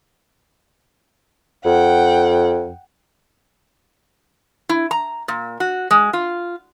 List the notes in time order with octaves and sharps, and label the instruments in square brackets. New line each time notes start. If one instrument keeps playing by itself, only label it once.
[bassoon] F2 [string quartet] F#5 G5
[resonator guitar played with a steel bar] E4
A#5
A#2
F#4
G#3
F4